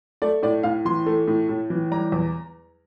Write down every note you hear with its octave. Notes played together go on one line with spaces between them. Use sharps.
A3 D5
A2 D5
A2 F5
E3 C6
A3
A2
A2
E3
G3 A#5
E2